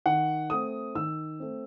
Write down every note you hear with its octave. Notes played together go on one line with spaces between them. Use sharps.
D#3 F#5
A3 C4 D#6
D#3 E6
A3 C4